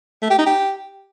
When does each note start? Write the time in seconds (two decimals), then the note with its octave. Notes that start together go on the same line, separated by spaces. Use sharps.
0.22 A3
0.30 G4
0.38 D#4
0.46 G4